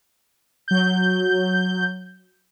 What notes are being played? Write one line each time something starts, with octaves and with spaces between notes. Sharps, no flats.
F#3 G6